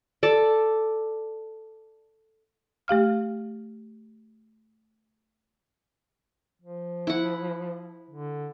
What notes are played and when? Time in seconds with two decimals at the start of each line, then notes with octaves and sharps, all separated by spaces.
0.23 A4 D5
2.88 A3 G4 F5 F6
6.62 F3
7.07 E4 F#5
8.10 D3